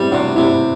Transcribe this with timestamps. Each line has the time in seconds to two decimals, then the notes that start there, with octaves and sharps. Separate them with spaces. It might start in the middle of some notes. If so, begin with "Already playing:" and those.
Already playing: G3 B3 C4 E4
0.11 C3 D4 F#4
0.36 C3 C4 E4